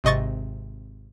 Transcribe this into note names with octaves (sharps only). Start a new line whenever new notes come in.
G#1 C3 D#5 C#6 A6